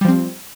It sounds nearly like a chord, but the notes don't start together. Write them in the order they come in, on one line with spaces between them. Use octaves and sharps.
G3 F3 C4